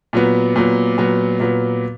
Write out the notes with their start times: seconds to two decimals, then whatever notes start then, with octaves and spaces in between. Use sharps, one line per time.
0.13 A#2 F#3 B3
0.56 A#2 F#3 B3
0.98 A#2 F#3 B3
1.40 A#2 F#3 B3